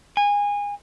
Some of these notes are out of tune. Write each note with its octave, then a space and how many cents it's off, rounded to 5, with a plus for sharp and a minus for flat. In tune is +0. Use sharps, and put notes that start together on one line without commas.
G#5 -25